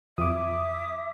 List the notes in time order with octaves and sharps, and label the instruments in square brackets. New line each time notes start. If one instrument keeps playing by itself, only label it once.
[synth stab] F2 [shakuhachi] E5 [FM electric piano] D6 D#6